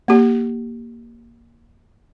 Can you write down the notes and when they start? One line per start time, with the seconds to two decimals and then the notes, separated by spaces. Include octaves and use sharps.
0.08 A#3 G4